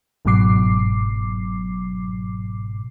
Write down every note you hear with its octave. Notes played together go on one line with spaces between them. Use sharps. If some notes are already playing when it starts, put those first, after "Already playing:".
G1 G#2 B2 F#3 D6 C7